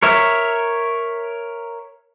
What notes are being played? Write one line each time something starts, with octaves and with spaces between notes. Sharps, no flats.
A#4 C#5 E5